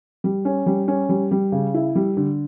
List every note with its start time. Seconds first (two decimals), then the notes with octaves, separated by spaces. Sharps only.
0.24 G3
0.45 C#4
0.66 G3
0.88 C#4
1.09 G3
1.31 G3
1.52 C#3
1.74 E4
1.95 G3
2.17 D3